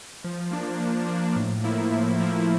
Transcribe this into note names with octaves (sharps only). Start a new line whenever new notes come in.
F3
A#3 D4
F3
A#3 D4
A2
F3 A#3 E4
A2
F3 A#3 E4